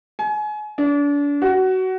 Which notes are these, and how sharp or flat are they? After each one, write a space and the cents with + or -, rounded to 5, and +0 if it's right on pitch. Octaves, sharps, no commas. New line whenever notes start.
G#5 +30
D4 -35
F#4 +20